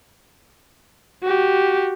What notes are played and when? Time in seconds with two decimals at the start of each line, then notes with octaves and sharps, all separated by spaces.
1.23 F#4 G4